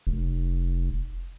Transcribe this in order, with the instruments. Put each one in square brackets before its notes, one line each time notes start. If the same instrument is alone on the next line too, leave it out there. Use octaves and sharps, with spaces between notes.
[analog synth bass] F1